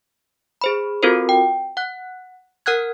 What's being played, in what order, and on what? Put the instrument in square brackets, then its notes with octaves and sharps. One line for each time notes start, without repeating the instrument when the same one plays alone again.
[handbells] G#4 C5 B5
C4 F4 F#4 A4 A#4 C5
G5
F#5 F#6
A#4 F#5 F6 F#6 G#6